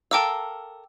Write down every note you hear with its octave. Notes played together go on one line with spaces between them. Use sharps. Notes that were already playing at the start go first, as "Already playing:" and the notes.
A4 A#4 F5 G5 D6 E6